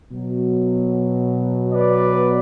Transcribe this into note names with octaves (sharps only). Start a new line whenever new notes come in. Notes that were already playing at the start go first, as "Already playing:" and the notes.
B2 F#3
B4 D5